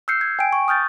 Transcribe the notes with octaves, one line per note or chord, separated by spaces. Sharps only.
E6 F6 G6 C7 C#7
G#6
G5 G#5 D7
C#6
D#6 F6 G6 A6